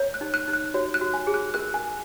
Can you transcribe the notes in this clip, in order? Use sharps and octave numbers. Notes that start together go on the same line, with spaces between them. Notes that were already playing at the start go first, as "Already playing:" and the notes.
Already playing: C#5
F#6
D#4
F#6
D#4
F#6
F#4 C#5
F#6
F#4
G#5
G#4
F#6
A#4 F#6
G#5